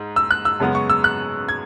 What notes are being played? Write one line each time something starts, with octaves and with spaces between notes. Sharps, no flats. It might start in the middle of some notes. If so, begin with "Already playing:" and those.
Already playing: G#2
E6
F#6
E6
F#2 C#3 G#3 B3
C#6
E6
F#6
G#6